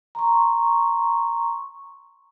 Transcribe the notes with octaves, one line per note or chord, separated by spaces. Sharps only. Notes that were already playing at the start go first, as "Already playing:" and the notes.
A#5 C6 C#6